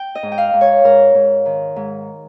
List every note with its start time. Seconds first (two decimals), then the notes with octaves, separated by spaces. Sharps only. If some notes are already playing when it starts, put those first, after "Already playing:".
Already playing: G5
0.15 D#5
0.23 G#2
0.32 G5
0.38 F5
0.54 G#2
0.61 C#5
0.84 G#2 A#4
1.15 G#2
1.46 D#3
1.76 G#2